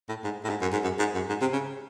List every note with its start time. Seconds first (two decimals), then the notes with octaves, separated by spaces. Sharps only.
0.09 A2
0.24 G#2
0.44 A2
0.50 G#2
0.62 F#2
0.73 G#2
0.84 F#2
0.99 G#2
1.14 F#2
1.29 G#2
1.41 C3
1.53 C#3